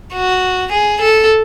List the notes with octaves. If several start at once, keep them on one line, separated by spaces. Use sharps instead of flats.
F#4
G#4
A4